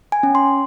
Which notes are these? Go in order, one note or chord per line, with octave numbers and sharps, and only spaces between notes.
G#5
C#4
C6